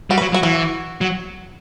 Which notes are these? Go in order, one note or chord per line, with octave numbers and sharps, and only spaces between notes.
G3 F#4
F#3 B4
F#3 F#4
E3 F#4
F#3